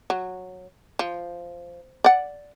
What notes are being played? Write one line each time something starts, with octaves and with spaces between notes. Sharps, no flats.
F#3
F3
D5 F#5